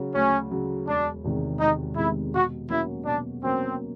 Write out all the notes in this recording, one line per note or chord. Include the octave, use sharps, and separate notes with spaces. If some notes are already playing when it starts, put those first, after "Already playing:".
Already playing: C#3 F#3
D2 C#4
C#3 F#3
E1 D4
E2 C3 D#3 G#3
E1 D#4
E2 C3 D#3 G#3 E4
B2 F#4
F#3 A#3 C#4 E4 F#4
B2 D4
F#3 A#3 C4 C#4 F#4